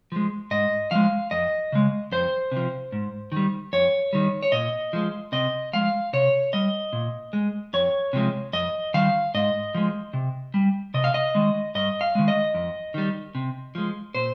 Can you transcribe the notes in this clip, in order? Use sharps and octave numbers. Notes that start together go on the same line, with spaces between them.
F3 G#3
G#2 D#5
F3 G#3 F5
F2 D#5
C#3 G#3
F2 C5
C3
F3
G#2
D#3 G3
F2 C#5
D#3 G3
C#5
A#2 D#5
F3 G#3
C3 D#5
F3 G#3 F5
C3 C#5
G3 D#5
A#2
G#3
F2 C#5
C3 F3 G#3
F2 D#5
D#3 G3 F5
G#2 D#5
F3 G#3
C3
G3
C3 D#5
F5
D#5
D#3 G#3
G2 D#5
F5
D#3 G#3
D#5
F2
D#3 G3
C3
F3 G#3
A#2 C5